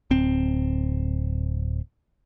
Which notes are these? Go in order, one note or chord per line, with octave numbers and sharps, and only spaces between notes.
D1 C4